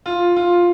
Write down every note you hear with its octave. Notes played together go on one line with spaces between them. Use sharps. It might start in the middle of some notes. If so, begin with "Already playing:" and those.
F4
F4